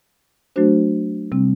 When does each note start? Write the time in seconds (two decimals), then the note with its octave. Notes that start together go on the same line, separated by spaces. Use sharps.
0.56 F#3 A3 D4 F#4 C5
1.32 C3 G3 C4